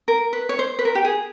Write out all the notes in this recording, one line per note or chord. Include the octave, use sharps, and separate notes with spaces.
A#4
B4
C#5
C5
B4
A#4
G4
G#4